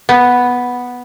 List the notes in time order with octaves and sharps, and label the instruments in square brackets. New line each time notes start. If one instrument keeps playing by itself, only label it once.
[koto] B3